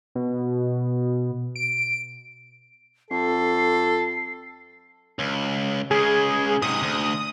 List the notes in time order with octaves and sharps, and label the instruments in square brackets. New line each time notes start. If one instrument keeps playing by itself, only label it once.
[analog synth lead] B2
D7
[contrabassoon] F2 [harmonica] A4 [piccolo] C7
[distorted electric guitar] C#2
[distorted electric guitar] C#2 C#3 [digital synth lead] G#4
[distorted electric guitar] G#2 C3 [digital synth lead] D#6
[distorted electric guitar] D2